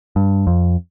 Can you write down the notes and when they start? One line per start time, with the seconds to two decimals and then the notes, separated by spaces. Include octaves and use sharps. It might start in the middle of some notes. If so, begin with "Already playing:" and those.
0.16 G2
0.47 F2